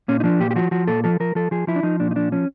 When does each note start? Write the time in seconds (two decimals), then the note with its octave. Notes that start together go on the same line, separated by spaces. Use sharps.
0.08 A#2 C#4
0.20 D#4
0.24 F3 D4
0.40 A#2 G4
0.51 G4
0.56 F3 F#4
0.71 F3 F#4
0.87 A#2 A4
1.04 F3 A4
1.20 F3 A#4
1.35 F3 A4
1.51 F3 G#4
1.67 F3 E4
1.76 D4
1.83 F3 D#4
2.00 A#2 D4
2.11 D#4
2.16 F3 D4
2.32 F3 C#4